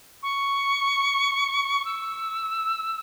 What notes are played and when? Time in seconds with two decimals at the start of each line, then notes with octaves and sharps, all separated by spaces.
0.23 C#6
1.85 E6